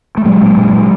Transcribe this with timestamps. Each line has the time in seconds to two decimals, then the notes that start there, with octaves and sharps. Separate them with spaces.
0.17 A3
0.25 A#2 F#3 G#3
0.42 A#2
0.57 A#2
0.73 A#2